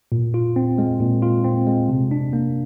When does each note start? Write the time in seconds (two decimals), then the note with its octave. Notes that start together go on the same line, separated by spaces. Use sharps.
0.12 A#2
0.34 F4
0.56 C4
0.78 G#3
1.00 A#2
1.22 F4
1.44 C4
1.67 G#3
1.89 C3
2.11 D4
2.33 A#3